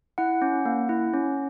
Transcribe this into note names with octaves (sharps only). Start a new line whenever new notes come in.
E4 F#5
C#4
A#3
E4
C#4